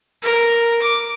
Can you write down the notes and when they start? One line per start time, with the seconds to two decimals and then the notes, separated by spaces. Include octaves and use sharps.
0.23 A#4
0.82 D6